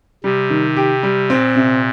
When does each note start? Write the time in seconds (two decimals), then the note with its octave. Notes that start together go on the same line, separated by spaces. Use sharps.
0.24 C3 G3
0.50 D#3
0.77 G4
1.03 G3
1.30 A#2 C4
1.56 C3